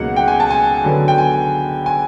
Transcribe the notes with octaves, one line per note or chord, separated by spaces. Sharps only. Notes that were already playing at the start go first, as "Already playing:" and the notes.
Already playing: C#2 B2 F#3 A#3 D#4 F#5
G5
G#5
A5
G#5
D3 F#3 B3
G5
G#5
G#5